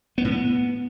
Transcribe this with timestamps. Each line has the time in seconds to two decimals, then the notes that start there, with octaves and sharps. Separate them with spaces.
0.18 B3
0.25 A2
0.31 B3